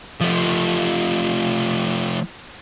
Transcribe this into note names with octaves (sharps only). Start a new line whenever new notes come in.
F3 A3